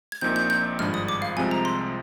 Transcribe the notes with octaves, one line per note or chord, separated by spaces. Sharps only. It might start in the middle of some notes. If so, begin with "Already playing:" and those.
G#6
A#1 A#2 F3 C4 D#4 G6
G6
G6
G#1 G2 F3 G#3 D4 F6
D#6
D6
F5
C2 C3 F3 G#3 C4 G#5
A#5
C6